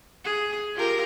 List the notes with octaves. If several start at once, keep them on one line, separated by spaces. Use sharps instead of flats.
G#4
F4 G4 A#4